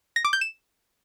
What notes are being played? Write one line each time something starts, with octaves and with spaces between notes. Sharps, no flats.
A#6
D6
G6
E7